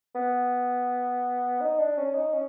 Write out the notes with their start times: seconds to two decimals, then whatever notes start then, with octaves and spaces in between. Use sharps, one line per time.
0.15 B3
1.61 D#4
1.79 D4
1.97 C#4
2.15 D#4
2.33 C#4